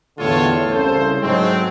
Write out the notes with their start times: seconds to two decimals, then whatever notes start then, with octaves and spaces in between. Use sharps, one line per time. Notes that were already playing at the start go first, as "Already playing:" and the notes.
0.18 E2 A2 D3 F4 A4 C#5
0.70 C2 C#3 A4 C5
1.21 G#2 F#3 G#3 A3 C4